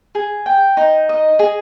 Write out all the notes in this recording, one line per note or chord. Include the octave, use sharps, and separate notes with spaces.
G#4
G5
D#4
D#5
G#4